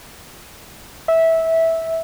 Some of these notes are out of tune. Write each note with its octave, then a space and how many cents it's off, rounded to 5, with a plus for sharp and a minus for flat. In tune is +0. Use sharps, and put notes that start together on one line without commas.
E5 -15